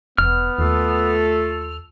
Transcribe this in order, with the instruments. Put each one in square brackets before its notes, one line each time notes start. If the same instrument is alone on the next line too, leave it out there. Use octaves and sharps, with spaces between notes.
[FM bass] E1 [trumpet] B3 [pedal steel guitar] F6
[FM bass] D#2 [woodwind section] A3 F4 A4